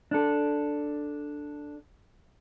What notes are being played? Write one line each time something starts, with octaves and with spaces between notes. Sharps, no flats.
D4 A4